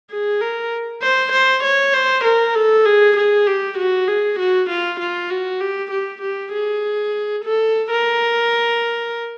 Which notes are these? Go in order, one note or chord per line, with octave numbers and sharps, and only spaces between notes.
G#4
A#4
C5
C5
C#5
C5
A#4
A4
G#4
G#4
G4
F#4
G#4
F#4
F4
F4
F#4
G4
G4
G4
G#4
A4
A#4